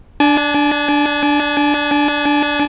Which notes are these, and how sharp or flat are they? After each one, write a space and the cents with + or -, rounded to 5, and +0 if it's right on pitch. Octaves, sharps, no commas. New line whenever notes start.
D4 +0 G#5 +45